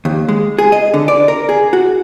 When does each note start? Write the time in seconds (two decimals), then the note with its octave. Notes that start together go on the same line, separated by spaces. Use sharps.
0.05 D#2
0.29 G#3
0.59 G#4
0.72 D#5
0.94 D3
1.08 D5
1.28 A#4
1.49 G#4
1.73 F#4